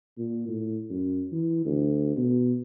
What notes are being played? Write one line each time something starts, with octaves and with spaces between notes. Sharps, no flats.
A#2
A2
F#2
E3
D2
B2